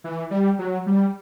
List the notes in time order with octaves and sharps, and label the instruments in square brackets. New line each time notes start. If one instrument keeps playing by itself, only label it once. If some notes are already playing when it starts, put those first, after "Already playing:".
[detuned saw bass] E3
G3
F#3
G3